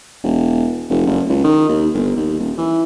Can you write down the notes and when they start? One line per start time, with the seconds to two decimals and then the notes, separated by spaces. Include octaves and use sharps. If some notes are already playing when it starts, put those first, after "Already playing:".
0.24 E1
0.90 F1
1.07 F#1
1.29 C#2
1.44 D#3
1.69 D#2
1.94 G1
2.16 D#2
2.39 D#1
2.58 E3